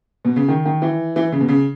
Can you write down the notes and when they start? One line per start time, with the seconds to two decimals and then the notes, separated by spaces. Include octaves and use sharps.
0.25 B2
0.36 C#3
0.48 D#3
0.65 D#3
0.82 E3
1.16 E3
1.32 C#3
1.41 B2
1.48 C#3